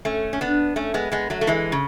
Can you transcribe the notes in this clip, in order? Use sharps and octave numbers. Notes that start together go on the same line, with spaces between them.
A3 C#4
C#4
B3 D4
A3 C#4
G#3 B3
G#3 B3
F#3 A3
A3
E3 G#3
C#3